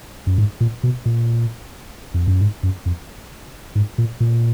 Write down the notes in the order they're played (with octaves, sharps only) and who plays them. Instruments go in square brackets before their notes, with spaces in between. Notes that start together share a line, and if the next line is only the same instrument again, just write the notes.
[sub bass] F#2
G#2
A#2
B2
A#2
F2
F#2
G#2
F#2
F2
G#2
A#2
A#2